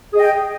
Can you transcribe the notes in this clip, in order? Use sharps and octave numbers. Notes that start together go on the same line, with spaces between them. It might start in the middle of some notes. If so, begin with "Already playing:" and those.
G#4 D#5 G5